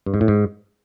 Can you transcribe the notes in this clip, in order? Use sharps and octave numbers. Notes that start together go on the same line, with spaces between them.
G2
G#2
A2
G#2